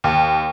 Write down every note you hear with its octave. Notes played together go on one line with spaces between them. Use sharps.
D#2